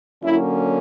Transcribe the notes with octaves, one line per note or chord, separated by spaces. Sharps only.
D3 F#3 A#3 C#4 E4